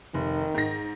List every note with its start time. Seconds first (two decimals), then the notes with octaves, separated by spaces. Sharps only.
0.14 F1 D#3
0.55 G#2 A#6